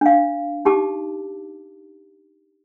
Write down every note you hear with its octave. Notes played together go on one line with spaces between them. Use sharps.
D4 F5
D#4 G4 A5 D6